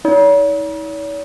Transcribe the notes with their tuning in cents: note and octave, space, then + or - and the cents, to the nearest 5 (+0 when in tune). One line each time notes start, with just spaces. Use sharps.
D#4 +45 C#5 +45